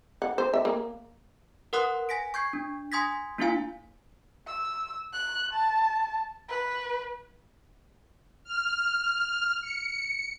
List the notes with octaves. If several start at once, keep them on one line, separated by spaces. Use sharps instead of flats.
F#5
C5
E5
A#3
A#4 B4 F#5 C6 D#6 F#6
G#5 A#6 B6 D7
C#6 G6 G#6 C7
D4
G#5 C6 D#6 G#6 A#6 B6
A#3 D4 E4 F4 F5 G#5
E6
F#6
A5
B4
F6
C#7